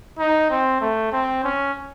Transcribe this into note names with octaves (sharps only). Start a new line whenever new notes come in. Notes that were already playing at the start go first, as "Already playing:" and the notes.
D#4
C4
A3
C4
C#4